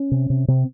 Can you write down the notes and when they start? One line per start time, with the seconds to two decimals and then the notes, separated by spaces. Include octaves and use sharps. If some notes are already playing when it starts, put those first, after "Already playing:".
Already playing: C#4
0.11 C3
0.30 C3
0.48 C3 C4